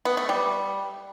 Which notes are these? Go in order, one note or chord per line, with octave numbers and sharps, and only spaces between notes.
B3
A3
G3